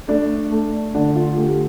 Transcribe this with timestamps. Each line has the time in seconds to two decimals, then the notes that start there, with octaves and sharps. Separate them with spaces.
0.08 A3 D4
0.51 A3
0.94 D3 D4
1.15 F4
1.37 A3 G4